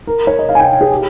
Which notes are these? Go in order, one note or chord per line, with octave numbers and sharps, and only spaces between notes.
A#4
C#5
D#5
F5
G#5
G5
G#4
G4